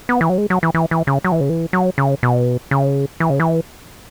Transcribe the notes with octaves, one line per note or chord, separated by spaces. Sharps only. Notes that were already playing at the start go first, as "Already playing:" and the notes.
B3
E3
F#3
G#3
F#3
E3
E3
E3
C#3
F#3
E3
C#3
E3
F#3
C#3
B2
C#3
E3
C#3
E3